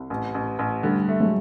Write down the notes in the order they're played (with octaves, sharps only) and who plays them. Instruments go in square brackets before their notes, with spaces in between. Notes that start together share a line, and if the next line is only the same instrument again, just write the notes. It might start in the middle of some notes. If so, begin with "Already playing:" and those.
Already playing: [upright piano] C2
A1
A1
A1
[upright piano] D3 [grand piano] G3 A3
[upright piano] A3
[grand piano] F#3 G#3